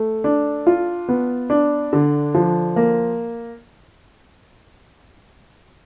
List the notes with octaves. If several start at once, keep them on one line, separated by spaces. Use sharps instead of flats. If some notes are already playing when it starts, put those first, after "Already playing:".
Already playing: A3
D4
F4
B3
D4
D3
F3
A#3